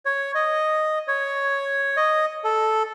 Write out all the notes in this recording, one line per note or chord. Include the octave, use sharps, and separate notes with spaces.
C#5
D#5
C#5
D#5
A4